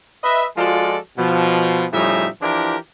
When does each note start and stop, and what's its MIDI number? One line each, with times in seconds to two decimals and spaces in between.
0.23 0.45 71
0.23 0.45 75
0.23 0.45 76
0.57 0.96 53
0.57 0.96 56
0.57 0.96 65
0.57 0.96 66
0.57 0.96 69
0.57 0.96 74
1.18 1.85 47
1.18 1.85 53
1.93 2.27 45
1.93 2.27 49
1.93 2.27 53
1.93 2.27 55
1.93 2.27 63
1.93 2.27 76
2.42 2.76 52
2.42 2.76 53
2.42 2.76 62
2.42 2.76 64
2.42 2.76 67
2.42 2.76 70